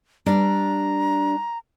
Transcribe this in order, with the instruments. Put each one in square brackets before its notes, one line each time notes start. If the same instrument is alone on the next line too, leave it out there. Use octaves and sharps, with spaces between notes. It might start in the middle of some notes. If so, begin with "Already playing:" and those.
[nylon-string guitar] G3 D4 D5 [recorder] A#5